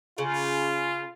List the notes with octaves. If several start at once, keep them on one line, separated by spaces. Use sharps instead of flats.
C#3 F4